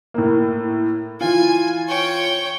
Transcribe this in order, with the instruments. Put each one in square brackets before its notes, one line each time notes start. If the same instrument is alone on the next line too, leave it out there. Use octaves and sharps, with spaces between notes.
[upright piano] A2 A#3
[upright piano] E3 F4 [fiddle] G#5
[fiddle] C#5 G5